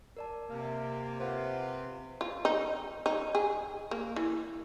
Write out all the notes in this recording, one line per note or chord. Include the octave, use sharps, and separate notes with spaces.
A#4 D5 A5
C3 A#3
F4 B4 C5 F#5
F4
D#4
D#4
G#4
A#3
E3